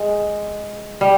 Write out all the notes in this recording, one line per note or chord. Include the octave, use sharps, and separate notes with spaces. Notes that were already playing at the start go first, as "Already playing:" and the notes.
Already playing: G#3
G3